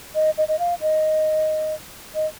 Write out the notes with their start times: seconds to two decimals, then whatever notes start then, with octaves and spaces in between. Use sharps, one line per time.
0.15 D#5
0.38 D#5
0.48 D#5
0.59 F5
0.81 D#5
2.15 D#5